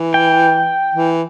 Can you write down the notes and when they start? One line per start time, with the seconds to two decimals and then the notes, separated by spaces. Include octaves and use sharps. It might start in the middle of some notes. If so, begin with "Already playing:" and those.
Already playing: E3
0.14 G5
0.94 E3